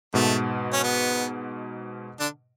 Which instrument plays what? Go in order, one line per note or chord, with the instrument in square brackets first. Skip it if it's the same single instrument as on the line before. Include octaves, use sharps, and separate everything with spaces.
[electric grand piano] G#2 B2 [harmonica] A3
[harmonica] C#4
B3
D3 D4